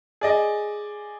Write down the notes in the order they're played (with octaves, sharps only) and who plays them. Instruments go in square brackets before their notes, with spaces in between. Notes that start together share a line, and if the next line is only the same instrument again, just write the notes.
[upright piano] G#4 D5 D#5